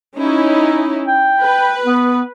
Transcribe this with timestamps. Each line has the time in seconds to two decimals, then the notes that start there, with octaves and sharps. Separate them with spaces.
0.18 C#4 D#4 E4
1.07 G5
1.42 B4
1.85 B3